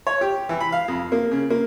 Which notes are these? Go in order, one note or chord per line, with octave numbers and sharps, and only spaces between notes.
C#5
G4
E3
B5
F5
F2
A#3
C#3
A#3